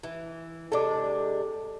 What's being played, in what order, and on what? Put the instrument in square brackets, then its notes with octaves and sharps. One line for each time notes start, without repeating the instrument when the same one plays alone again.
[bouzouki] E3
[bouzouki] C3 G#3 D4 [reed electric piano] A4 D6